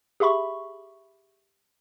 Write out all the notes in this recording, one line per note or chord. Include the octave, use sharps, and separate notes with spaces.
G4 G#4 E5 B5 C#6